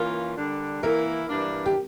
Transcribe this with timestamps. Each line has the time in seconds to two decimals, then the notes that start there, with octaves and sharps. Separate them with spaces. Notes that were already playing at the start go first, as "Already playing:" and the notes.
Already playing: E3 A#3 C#4 F4 A#4
0.38 D3 G3 D4
0.83 E3 A#3 E4 A#4
1.29 G2 E3 A#3 D4
1.66 G4